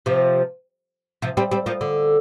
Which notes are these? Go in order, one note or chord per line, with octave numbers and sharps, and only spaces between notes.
C3 F3
C3 F3
G3 C4
G3 C4
F3 A#3
D3